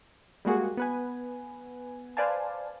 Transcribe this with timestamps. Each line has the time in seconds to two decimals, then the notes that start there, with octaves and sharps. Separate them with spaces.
0.45 G3 G#3 A#3 F#4 G#4
0.77 B3 B4 G#5
2.17 B4 C5 D5 F5 G#5 A5